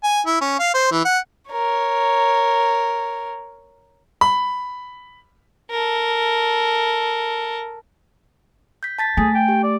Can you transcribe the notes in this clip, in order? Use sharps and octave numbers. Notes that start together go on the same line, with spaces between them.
G#5
E4
C#4
F5
C5
E3
F#5
A#4 C#5
B5
A4 A#4
G6 B6
A5 A6 B6
A3 G#4 G#5
G5
G4
D5